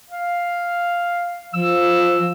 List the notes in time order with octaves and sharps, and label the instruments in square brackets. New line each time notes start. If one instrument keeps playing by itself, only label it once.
[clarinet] F5
[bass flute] F3 [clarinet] E6